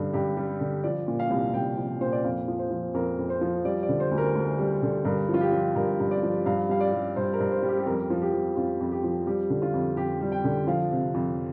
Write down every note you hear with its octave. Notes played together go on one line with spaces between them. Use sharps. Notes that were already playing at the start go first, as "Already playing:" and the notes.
Already playing: G2 D3 G3
G2 G4
G3
D3
F3 D5
A#2
F5
C2
C2 G5
F3
A#2 C5
D5
F2 F5
F3
C5
F3
F2 A#4
F2
C5
F3
G3 D5
D5
D3
C5
D2
A#4
D2
G3
D3
G2 A#4
F3
F4
G4
F3
G2 A#4
G2
D5
F3
G2 F5
G3 F5
D5
G3
G2 C5
A#4
G2
C5
G3
G4
G4
F2 A#4
F3
G4
F3
F2 F4
F2
G4
F3
G3 G4
D3
F4
F2
F2 G4
G3
G5
D3
F3 F5
C3
F2